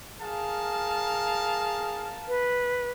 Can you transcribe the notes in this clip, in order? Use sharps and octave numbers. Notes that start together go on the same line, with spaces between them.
G#4 A#4 F5 A5
B4